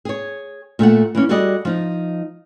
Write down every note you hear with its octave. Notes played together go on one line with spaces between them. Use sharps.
G#4 C#5
A#2 A3 A4 F#5
E3 A#3 C#4
G3 F#4 G#4 A4 D5 D#5
F3 D#4